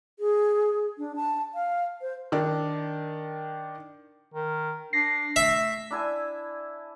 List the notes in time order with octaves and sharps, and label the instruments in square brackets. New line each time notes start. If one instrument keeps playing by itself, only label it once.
[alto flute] G#4
D4
A5
F5
C5
[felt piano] D#3 D4
[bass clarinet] D#3
[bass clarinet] D4 [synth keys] A#6 C7
[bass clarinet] A3 [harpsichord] E5
[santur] D4 E4 G#5 E6